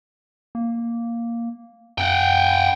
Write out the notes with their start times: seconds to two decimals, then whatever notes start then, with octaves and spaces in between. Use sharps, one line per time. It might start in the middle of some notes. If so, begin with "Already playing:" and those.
0.55 A#3
1.98 F#2 F#5 G5